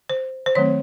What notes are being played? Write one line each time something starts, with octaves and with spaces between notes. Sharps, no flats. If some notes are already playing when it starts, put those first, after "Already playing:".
C5
C5
D#3 F#3 A3 C4 C#5